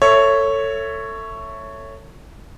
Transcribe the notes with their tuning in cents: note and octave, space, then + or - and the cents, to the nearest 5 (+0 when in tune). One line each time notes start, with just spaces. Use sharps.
A4 +25 C#5 +0 E5 +0